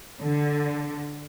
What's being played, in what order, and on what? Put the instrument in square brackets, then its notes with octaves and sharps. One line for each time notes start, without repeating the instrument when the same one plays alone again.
[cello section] D3